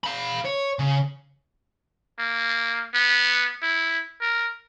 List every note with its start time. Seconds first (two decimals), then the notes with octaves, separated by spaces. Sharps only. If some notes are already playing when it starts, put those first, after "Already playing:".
0.04 F5 B5
0.45 C#5
0.79 C#3
2.18 A#3
2.94 B3
3.62 E4
4.21 A#4